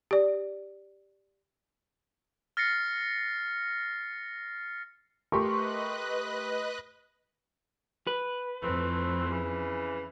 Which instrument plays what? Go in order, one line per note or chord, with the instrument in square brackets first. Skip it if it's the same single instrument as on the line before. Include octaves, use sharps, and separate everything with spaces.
[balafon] G4 D5
[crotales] F6 A6 A#6 C7 C#7
[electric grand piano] A3 G4 A#4 [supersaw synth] B4 D#5 F#6 [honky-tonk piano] C6 C#6
[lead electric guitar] B4
[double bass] F2 [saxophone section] E3 A3 C4
[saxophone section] C#3 E3